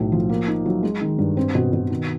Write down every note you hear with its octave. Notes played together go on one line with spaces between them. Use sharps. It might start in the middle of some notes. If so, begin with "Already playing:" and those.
Already playing: B1 A2
F3
A#3
D#4
F#3
G#3
D#3
G2
C4
B2
B2
D#3